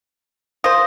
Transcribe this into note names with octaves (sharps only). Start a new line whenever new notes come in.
F4 C5 D#6 A#6